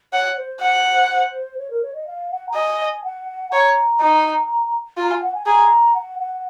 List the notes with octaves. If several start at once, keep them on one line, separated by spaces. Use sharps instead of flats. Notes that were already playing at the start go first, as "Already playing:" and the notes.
C#5 F#5
C5
F#5
C#5
A#4
C#5
D#5
F5
F#5
A#5
D#5 G#5
F#5
C#5 A#5
D#4
F4 A#5
G#5
F#5
G#5
G#4 A#5
F#5
F#5